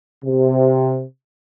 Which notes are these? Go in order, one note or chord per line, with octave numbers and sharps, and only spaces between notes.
C3